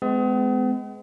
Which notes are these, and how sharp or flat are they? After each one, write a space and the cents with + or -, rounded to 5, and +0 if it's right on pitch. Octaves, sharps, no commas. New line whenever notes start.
G#3 +20 B3 +45